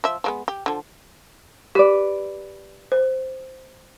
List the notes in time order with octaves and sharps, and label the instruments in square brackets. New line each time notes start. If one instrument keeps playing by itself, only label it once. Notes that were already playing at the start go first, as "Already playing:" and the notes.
[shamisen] F3 E5
F3 G#3 B3
G4
D3 F3
[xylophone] G4 [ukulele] B4 D5
[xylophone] C5